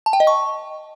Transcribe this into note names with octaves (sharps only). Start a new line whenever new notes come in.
A5
G5
D#5
C#6